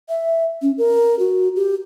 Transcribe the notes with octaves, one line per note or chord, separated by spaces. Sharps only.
E5
C#4
A#4
F#4
G4